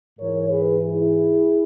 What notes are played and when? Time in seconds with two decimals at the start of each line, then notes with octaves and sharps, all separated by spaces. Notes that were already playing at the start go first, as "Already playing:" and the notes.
0.19 G#2 E3 A#4 C#5
0.49 G#4 B4
0.79 E4 G#4